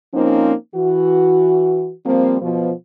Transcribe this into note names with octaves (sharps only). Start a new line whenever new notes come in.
F3 A#3 C4 C#4 D#4
E3 F#4
F3 G3 A#3 C4
B2 F3